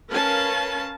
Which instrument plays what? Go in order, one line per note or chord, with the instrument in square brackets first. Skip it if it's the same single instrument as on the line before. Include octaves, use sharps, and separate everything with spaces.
[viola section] C#4 A#4 B4 F5 A5